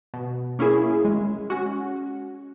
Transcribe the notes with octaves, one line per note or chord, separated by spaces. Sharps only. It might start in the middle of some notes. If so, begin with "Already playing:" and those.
B2
A#3 C#4 E4 G#4
G#3
C#4 F#4